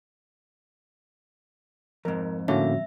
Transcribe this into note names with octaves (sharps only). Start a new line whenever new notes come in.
F2 G#2 A#4
A2 D3 A#3 C#4 F#4 E5